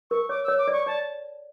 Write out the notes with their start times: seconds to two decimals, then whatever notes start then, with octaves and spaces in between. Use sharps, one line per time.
0.11 A#4 C#6
0.29 C#5 D6
0.44 C#5 E6
0.58 D6
0.68 D5
0.73 C#6
0.87 D5 A5